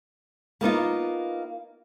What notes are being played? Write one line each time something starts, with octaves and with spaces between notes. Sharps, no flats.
A#3 B3 D#4 F4